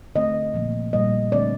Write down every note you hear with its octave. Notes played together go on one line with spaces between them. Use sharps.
D3 A3 C4 D#5
A#2 F3 A#3
A#2 G3 A#3 D#5
D3 A3 C4 D5